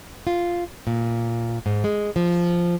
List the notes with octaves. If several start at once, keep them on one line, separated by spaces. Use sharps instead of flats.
F4
A#2
G#2
G#3
F3